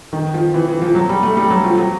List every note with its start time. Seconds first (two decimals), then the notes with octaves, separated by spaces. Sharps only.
0.13 D#3
0.34 F3
0.54 E3
0.68 E3
0.82 F3
0.95 F#3
1.09 G3
1.23 A3
1.37 G3
1.50 F#3
1.64 F3
1.78 F#3